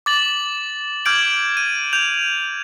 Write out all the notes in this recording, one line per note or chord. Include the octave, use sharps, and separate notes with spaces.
D6 A6 F#7
D6 F6 G6 G#6 D7 F#7
D#7
G6 F7